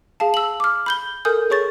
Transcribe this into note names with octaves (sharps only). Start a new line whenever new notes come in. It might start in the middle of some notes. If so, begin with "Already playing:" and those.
G#4 F5 A5
E6 F#7
D6 F6
B5 G6 G7
A4 A#4 G#5 D#6 G6
G#4 C#5 C#6 A6